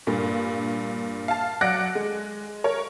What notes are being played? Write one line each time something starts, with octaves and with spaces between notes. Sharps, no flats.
G2 A#2
F5 A5
F#3 D5 F#5 F#6 A#6 D7
G#3
A#4 C#5